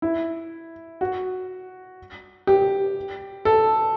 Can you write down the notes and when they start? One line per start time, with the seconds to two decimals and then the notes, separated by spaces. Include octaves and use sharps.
0.02 E4
1.01 F#4
2.47 G4
3.45 A4